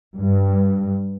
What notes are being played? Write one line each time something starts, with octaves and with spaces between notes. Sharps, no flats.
G2